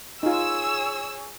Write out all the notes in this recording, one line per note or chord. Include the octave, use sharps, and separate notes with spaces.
D#4 F4 G#4 C#5 E6